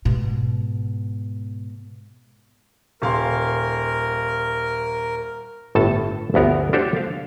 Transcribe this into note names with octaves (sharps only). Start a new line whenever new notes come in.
G#2 B2
D#1 A#4 F5 C6
G1 A2 A4 A5
G1 D2 B3 A#4 C#5
D4 F#4 G4 A4 C5 C#5
F5